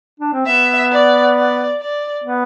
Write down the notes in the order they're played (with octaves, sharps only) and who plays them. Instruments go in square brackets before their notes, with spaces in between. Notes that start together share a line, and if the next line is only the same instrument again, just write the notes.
[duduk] D4
C4
[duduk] B3 [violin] E5
[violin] D5
D5
D5
[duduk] B3